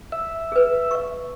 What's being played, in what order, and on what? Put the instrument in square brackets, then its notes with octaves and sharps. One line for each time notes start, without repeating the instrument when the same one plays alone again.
[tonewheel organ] E5
[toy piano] G#4 B4
C#6